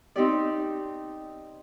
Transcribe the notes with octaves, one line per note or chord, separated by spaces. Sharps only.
C4 D#4 G4 D5